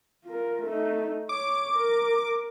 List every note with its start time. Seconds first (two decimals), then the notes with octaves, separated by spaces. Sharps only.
0.25 F4 A#4
0.62 A3 D#4
1.29 C#5 D6
1.75 A#4